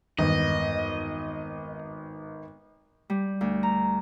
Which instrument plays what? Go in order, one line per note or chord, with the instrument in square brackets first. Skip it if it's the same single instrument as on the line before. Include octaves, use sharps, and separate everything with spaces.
[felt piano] G#1 B3 [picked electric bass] E2 G2 D#3 [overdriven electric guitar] D#5
[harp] G3
D2
A#5